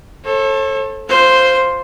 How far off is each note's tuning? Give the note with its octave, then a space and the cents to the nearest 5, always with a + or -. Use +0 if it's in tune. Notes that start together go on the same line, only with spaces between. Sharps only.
A4 +0 C#5 -45
F4 +0 C5 +0